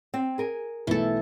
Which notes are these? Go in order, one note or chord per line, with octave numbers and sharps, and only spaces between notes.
C4
G#4 A#4 G#5
B1 E3 A3 A4